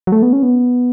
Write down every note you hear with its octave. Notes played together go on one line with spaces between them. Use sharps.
F#3
A3
B3
C#4
B3